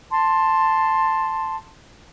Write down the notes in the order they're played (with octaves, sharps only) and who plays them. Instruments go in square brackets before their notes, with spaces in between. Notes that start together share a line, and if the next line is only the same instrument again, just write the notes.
[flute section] A5 C6